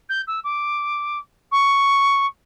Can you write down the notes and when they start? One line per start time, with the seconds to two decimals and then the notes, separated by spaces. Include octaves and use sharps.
0.09 G6
0.27 E6
0.44 D6
1.51 C#6